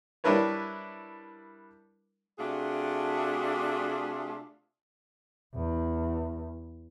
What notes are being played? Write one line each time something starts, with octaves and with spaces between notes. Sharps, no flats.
G3 D4 E4 A#4 B4 C#5
C3 A3 D4 F4 F#4 G#4
E2